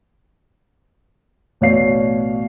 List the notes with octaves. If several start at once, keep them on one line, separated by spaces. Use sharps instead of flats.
A1 B2 C#5 D5 F5 C7